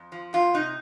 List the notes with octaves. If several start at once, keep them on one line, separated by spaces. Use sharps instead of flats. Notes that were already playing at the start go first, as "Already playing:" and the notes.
Already playing: F2
F3
F2 F4
C3 D#4